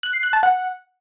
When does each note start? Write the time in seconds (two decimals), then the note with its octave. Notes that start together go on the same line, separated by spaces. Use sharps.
0.03 F#6
0.13 C7
0.23 F#6
0.33 A5
0.43 F#5